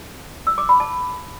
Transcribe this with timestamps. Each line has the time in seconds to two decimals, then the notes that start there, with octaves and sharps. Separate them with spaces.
0.47 E6
0.58 D6
0.69 B5
0.80 A5